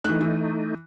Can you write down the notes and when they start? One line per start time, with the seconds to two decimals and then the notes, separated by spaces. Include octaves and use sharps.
0.04 E3 A3 D#4 F#6
0.21 E3